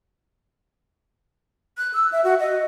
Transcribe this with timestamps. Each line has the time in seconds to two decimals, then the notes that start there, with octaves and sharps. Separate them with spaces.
1.78 F#6
1.93 E6
2.12 E5
2.24 F#4
2.40 D#5